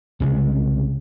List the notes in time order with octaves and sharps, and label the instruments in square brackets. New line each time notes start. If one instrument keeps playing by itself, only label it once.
[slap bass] C2 C#3 G#3